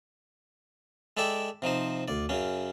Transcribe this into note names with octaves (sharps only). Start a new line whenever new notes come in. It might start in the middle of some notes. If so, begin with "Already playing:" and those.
G#3 A4 D5 E5 G5
C3 F3 D#4 C5
D2 D5
F#2 C#3 C#4